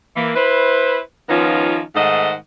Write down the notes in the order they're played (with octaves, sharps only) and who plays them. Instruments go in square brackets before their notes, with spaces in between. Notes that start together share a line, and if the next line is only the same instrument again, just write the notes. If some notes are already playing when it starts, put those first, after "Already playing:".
[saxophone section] E3 A#3
E4 B4 C5
D#3 F3 B3 C#4 D#4 F4
G#2 D#3 A3 C5 D#5 F#5